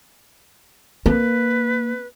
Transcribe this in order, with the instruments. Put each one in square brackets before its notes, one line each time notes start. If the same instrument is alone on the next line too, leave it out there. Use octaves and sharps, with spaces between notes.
[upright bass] A#3 [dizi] B4